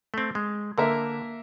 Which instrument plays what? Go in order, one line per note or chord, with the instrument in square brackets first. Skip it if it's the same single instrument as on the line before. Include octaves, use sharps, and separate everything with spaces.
[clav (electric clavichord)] A3 C4
G#3
[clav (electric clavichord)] D3 [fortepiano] A#3 A#4 E5